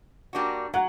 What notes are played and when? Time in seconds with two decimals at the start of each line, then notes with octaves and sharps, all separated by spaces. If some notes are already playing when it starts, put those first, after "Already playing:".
0.33 G3 A#3 D4 F#4
0.74 F#3 F#5